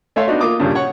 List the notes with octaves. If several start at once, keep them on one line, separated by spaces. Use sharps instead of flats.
A3 C#5 E5 F5 C6
B3 D4 D#4 F#4
A#3 F4 D6 D#6
G2 A#2 C#3 G3
C#5 F#5 C#6